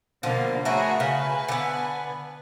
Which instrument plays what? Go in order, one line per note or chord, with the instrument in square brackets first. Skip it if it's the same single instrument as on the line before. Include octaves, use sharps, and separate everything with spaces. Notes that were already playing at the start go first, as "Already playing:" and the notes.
[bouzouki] B2 F3 [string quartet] D3 A#3
[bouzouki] A3 A#4 B4 [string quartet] F#4 G#4 C#5
[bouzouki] C#3 [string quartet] B4 G#5
[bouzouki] D3 B3